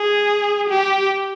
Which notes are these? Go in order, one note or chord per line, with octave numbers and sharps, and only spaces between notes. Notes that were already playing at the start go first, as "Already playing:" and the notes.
Already playing: G#4
G4